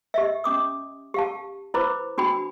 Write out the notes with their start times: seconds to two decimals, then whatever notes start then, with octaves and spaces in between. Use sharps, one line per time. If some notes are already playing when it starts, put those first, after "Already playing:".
0.14 G4 D#5 E5
0.44 C#4 D6 D#6
1.14 G4 F5 A5
1.74 E4 B4 C5 B5 D6
2.18 D4 F#4 G5 B5